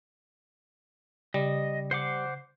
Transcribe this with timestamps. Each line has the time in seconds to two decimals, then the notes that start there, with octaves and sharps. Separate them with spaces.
1.34 C#3 G3 D#5
1.91 C5 F#5 D6